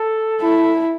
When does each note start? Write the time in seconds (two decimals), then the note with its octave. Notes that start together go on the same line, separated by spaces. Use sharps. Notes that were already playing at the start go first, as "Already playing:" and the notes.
Already playing: A4
0.41 E4